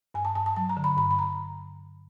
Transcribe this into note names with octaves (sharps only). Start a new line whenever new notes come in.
G2 G#5
A5
G2 A5
A5
F#3 A5
A#5
D3
B5
G2 B5
B5
A#5